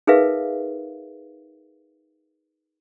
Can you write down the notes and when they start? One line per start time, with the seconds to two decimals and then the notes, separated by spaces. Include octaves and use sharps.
0.07 D#4 G#4 A#4 B4 E5 F5